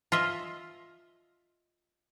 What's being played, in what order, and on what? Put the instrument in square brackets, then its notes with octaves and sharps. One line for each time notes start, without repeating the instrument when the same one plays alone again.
[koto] F4 D#5 E5